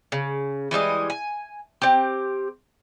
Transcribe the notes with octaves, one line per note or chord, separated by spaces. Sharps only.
C#3
E3 G3 G#3 D#5
G#5
C4 G4